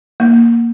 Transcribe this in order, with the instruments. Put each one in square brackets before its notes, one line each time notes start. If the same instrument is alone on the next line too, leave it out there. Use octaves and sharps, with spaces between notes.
[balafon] A#3